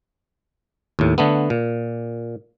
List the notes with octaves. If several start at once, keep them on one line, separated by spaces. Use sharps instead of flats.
D#2 A2
D3 A3 B3
A#2